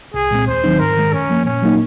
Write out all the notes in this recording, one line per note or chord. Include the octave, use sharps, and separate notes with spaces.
C2 G#4
A#2 G#3 C4
D#2 C5
D#3 F#3 C4 D#4
G#2 A#4
D#3 G#3
F#2 C#4
F3 A#3
A#2 C#4
F#3 A#3 D#4